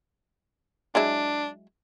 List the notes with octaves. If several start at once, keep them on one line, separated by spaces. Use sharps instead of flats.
F#3 G#3 D4 E4